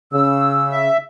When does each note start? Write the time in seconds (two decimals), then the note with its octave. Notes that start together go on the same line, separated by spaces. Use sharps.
0.13 C#3 E6
0.70 E5